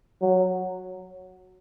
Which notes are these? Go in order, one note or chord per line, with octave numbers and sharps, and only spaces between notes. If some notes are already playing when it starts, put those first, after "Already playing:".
F#3